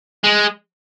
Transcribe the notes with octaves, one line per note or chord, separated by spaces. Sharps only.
G#3